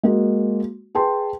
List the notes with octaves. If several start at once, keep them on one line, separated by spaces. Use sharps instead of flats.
G#3 A#3 F#4
G#4 B4 G5 A5 C6